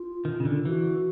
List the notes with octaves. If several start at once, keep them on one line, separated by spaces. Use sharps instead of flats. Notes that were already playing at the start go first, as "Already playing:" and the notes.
Already playing: F4
D#3
C#3
D3
E3 F#4